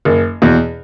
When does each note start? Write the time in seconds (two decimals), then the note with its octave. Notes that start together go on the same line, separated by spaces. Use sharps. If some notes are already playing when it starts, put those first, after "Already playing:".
0.05 F#1
0.42 E2 B2